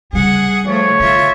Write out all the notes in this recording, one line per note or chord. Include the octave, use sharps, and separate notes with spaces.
C#3 G3 G#4 F#5
F3 A3 C#5
D3 F4 E5